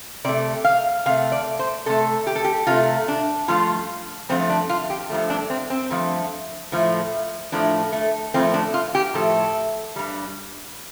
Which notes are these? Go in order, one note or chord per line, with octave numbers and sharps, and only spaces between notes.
C3 A3 D5
F5
C3 A3 F5
D5
C5
C3 A3 A4
G4
A4
G4
C3 A3 F4
D4
G2 F3 A3 F4
G2 F3 A3 C4
D4
F4
G4
G2 F3 A3
D4
C4
C4
G2 F3 A3
A2 F3 A3
A2 F3 A3 D4
A3
A2 F3 A3 C4
D4
F4
G4
A2 F3 A3 A4
G2 G3